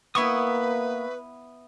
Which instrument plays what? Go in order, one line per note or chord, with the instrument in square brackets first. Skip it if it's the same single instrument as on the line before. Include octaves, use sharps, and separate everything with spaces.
[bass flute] A#3 [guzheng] B3 E4 [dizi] B4 [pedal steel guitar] E5 C#6 D#6